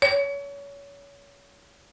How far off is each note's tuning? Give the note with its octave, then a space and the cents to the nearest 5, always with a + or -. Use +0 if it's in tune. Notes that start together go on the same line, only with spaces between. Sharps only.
C#5 +30